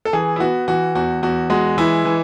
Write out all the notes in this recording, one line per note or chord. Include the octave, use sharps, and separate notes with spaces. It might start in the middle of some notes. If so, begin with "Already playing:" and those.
A4
E3 G#4
E4
B3 F#4
E3 F#4
E2 F#4
E2 F#4
G#3 F#4
E3 E4
E3